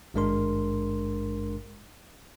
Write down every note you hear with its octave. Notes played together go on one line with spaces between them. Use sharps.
G#1 G2 G#3 D4 A#4 C6